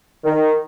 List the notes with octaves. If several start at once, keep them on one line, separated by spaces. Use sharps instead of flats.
D#3